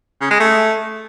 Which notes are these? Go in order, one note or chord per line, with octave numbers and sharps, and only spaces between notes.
C#3
G#3
A3